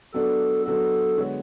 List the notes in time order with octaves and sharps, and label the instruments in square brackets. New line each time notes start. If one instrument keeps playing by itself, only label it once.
[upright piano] F#3 B3 D4 F#4 [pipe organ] A4
[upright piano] F#3 B3 D4 F#4 [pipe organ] A4
[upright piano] D3 G#3 B3 F#4 C#5